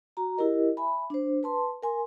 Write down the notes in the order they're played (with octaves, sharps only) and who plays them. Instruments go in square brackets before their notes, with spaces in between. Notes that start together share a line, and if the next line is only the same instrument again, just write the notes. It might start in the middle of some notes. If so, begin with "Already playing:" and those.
[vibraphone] F#4 A#5
E4 G4 A#4 D#5
E5 G#5 B5
D4 C5
B4 A5 C6
A#4 G#5 C6